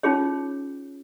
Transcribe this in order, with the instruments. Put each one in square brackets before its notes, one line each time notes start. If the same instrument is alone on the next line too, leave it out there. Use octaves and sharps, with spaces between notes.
[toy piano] C#4 D#4 F4 G#4 C#5